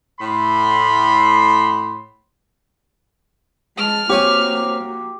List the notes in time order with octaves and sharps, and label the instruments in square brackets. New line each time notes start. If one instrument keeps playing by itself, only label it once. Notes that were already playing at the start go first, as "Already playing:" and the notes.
[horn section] A2 B5 C6
[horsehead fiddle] G#3 A5 [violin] F6
[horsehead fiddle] A#3 F#4 [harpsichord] C4 C#5 G#5 [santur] G4